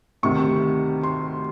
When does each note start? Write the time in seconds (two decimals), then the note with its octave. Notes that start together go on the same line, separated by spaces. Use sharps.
0.23 D2 C3 D#3 C#6
1.03 C6